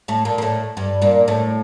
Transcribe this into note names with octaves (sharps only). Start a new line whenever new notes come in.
A2 A3
A#2 A#3
A#3
A2 A3
G2 G3
A#2 A#3
A2 A3